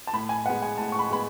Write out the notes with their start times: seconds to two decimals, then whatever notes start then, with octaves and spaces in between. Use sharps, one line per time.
0.07 A5
0.13 A2 B5
0.29 G#5
0.46 G#3 B3 F#5
0.62 G#5
0.78 A2 A5
0.92 C#6
0.99 B5
1.10 G#3 B3 B5